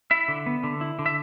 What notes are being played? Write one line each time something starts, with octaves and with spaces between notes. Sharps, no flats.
E4 E5
D3
B3
D3
E4
D3
E5